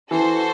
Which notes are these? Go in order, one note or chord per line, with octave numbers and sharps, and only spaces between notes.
E3 F#4 A4 C5